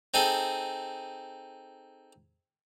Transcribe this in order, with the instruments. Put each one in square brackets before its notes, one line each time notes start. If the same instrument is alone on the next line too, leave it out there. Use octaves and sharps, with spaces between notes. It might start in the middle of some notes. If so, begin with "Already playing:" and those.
[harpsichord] C4 D#4 G#4 A4